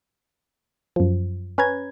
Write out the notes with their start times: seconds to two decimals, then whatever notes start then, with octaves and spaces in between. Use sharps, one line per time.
0.96 F#2 F3
1.58 C#4 B4 A#5 G#6